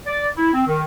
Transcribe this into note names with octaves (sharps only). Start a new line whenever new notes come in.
D5
E4
C4
D#3